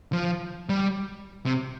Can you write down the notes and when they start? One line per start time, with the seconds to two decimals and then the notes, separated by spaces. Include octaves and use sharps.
0.13 F3
0.69 G3
1.46 C3